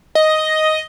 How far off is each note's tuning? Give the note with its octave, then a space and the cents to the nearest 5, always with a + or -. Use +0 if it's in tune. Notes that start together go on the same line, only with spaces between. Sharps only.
D#5 +5